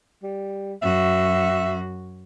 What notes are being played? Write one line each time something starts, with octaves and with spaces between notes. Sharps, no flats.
G3
F#2 F#4 E5